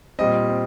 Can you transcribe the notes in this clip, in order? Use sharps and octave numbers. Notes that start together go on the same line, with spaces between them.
A#2 G3 C4 D#5
C4